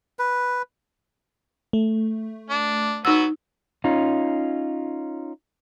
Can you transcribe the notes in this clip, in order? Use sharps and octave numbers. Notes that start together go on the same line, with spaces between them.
B4
A3
D4
F#3 B3 D#4 F#4 E6
C#4 D#4 F4